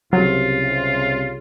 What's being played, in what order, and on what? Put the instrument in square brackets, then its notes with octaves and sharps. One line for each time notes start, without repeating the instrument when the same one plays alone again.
[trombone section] C2 C#3 [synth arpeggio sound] F#3 [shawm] F4